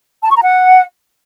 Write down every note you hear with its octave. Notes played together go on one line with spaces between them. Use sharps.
A5
C#6
A#5
F#5